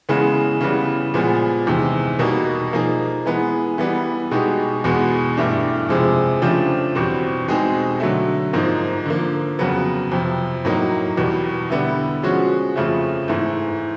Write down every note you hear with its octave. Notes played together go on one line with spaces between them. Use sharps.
C#3 E3 G#3 B3
C#3 E3 G3 B3
A#2 F3 G#3 B3
E2 C3 D#3 G#3
B2 G3 A#3 D#4
F3 A#3 D#4 G#4
E3 G#3 B3
E3 G3 B3
B2 G#3 B3 D#4 G4
E2 B2 G#3 B3
G2 E3 A3 D4 G4
F2 C3 F3 G#3
C#3 F3 A3 D4 G4
E2 B2 G3 C4
B2 G#3 C4 D#4 G#4
D3 F#3 A3
G#2 F3 A#3 D#4
D3 F3 A#3
F2 C#3 F#3 B3
F2 C3 F3
A2 F#3 A#3 D#4
E2 B2 G3
D3 G3 B3 E4
F3 G#3 C#4 F#4
F2 C#3 F3 A3
G#2 E3 A3